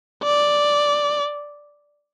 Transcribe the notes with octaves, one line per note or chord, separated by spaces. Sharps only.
D5